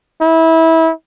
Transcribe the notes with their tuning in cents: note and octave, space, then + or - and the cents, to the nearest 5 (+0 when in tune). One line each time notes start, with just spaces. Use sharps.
E4 -25